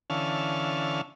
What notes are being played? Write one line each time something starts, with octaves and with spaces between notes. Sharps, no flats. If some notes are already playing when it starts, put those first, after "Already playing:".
D3 E3 C#4 F5 A5